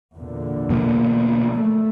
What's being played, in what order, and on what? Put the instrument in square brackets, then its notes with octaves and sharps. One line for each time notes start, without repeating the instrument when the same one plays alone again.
[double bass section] E2 A#2 D3
[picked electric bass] B2 F3 A#3
[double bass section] A3